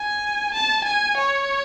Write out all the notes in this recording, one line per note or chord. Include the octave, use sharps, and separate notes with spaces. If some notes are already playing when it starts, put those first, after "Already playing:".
Already playing: G#5
A5
G#5
C#5